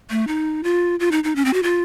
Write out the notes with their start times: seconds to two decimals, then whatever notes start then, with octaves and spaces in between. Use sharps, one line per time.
0.10 A3
0.27 D#4
0.64 F4
1.00 F4
1.11 D#4
1.24 D#4
1.36 C#4
1.45 C4
1.53 F#4
1.63 F4